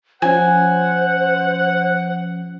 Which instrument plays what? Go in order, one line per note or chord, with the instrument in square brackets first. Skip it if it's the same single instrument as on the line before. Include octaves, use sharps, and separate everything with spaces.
[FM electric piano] F3 C#4 [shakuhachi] C5 [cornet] F#5 [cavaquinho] G#5